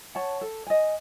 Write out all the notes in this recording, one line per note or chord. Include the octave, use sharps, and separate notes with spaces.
C#5 F#5 A5
A4
D#5 G#5